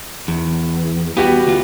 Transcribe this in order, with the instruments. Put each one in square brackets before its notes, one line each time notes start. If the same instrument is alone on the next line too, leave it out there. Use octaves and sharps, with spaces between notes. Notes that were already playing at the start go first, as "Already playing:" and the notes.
[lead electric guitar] E2
[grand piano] G3 F#4 G4 [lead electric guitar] B3
[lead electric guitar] D2 F4